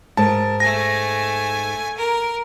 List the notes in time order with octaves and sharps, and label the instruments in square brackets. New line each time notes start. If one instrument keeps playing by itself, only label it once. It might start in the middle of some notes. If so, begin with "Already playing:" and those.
[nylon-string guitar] G#2 [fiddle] A#4 [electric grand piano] A5
[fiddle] A3 G#5 [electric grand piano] A#6
[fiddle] A#4